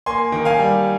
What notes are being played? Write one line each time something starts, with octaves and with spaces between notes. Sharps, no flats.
A#3 G#5 C6
D#3
F5 G#5
G3